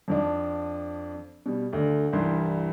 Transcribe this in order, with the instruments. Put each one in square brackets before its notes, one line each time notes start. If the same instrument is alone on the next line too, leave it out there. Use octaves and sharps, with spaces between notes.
[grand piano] F2 F3 D4
B2 G3
D2 D3
C2 G2 E3 C6